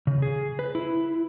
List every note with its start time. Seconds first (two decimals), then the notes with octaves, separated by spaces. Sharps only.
0.07 C#3
0.22 G#4
0.59 B4
0.75 E4